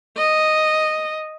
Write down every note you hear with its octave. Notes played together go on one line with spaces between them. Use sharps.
D#5